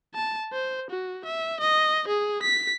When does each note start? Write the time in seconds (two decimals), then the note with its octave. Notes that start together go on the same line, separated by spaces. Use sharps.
0.14 A5
0.53 C5
0.90 F#4
1.25 E5
1.60 D#5
2.07 G#4
2.43 B6